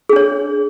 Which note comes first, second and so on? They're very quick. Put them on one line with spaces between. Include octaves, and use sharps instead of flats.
G#4 D4 C#5